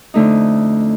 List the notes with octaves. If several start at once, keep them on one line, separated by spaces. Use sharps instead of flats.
F2 D3 A3 D#4